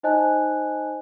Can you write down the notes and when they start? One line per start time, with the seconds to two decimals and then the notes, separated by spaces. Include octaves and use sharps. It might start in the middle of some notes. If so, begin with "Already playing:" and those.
0.03 D#4 C5 D#5 G#5 A5 F#6